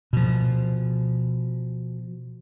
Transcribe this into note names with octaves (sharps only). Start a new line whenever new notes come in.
B2 F3